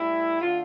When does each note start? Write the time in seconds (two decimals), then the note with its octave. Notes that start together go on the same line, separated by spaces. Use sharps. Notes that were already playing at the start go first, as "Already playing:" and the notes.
Already playing: A2 G3 E4
0.40 D3 A3 F4